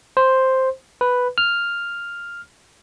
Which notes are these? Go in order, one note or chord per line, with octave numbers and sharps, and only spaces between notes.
C5
B4
F6